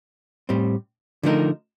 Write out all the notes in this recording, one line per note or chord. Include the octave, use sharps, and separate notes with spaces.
A2 G3 C4
D3 F3 A3 D#4 A#4